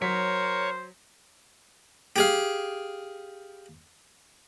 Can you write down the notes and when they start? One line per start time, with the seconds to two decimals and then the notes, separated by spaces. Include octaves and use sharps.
0.02 F#3 A#4 C5 C#5 B6
2.16 G4 G#4 F5